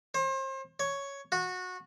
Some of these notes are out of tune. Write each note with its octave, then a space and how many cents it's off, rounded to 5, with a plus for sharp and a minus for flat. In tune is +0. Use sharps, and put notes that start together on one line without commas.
C5 +35
C#5 +5
F#4 -20